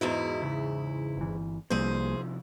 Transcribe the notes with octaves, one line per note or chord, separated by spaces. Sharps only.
E2 G#2 E4 F#4 D#5
C#3
G1 E3
C2 C3 F3 G3 A#3 E4 G#4 C5